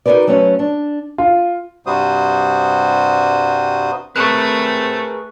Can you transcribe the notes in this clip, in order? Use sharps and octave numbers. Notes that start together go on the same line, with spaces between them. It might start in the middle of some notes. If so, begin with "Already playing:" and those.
D#4 F#4 G#4 A#4 B4 D5
F#3 A3 C4 C#4 B4
D4
F4
G2 C3 G3 F#4 C5 D#6
A3 C4 G#4 A#4 B4 C#6 F#6